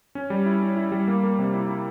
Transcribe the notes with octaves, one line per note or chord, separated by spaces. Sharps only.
C#4
G3
E4
C#4
E4
G3
A#3
A#3
C3
E4
E4